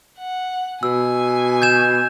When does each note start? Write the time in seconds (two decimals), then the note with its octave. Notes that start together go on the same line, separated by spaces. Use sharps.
0.19 F#5
0.83 B2 G#5 E6
1.62 G6 G#6 E7